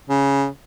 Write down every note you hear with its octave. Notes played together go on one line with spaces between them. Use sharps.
C#3